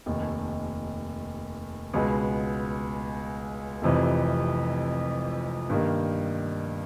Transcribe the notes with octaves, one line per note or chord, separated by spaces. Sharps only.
F1 D#2 D#3
C#2 B2 G#3 B3
F1 F2 C3 E3
G2 D#3 G3 A#3 D#4